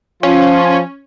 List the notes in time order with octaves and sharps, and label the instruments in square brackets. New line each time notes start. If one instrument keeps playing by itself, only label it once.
[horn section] F3 F4 [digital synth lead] C#4